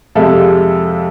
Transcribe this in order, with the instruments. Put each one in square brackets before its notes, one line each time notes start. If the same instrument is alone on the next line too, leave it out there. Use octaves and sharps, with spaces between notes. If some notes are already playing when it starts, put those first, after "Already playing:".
[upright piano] F2 C3 G#3 A4 E5 F5